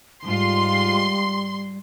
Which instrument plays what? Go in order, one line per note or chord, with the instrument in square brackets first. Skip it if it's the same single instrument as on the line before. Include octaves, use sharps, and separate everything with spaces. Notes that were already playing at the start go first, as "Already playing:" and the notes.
[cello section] G#2 F4 [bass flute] G3 [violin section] C6